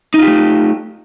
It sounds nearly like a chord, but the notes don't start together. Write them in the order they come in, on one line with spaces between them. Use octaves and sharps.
D#4 F4 G4 A3